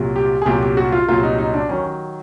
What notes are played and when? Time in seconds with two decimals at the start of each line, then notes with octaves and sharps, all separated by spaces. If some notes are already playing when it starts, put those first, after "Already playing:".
Already playing: C2 A#2 F#3
0.16 G4
0.42 G#4
0.46 C2 A#2 F#3 G4
0.62 G4
0.77 F#4
0.92 F4
1.08 C2 A#2 F#3 F4
1.23 D#4
1.38 D#4
1.54 D4
1.69 D#3 F#3 C#4